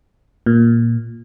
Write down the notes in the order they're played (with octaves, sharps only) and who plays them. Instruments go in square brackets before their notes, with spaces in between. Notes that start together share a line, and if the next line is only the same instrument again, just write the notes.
[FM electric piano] A#2